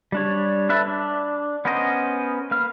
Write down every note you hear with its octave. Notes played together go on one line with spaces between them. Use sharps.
G3 D4 C#5
D4 A4 B4 E5
D4
B3 C#4 A#4 C5 D#5
A#3 B4 F6